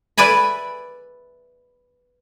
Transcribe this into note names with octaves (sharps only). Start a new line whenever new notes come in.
B4 D5 E5 G#5 B5